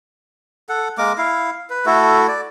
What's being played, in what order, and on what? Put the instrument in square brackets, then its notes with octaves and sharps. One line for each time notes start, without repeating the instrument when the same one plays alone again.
[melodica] A4 F#5
G#3 A#3 A#4 D6
E4 F5
B4
A3 E4 F#4 A4
D5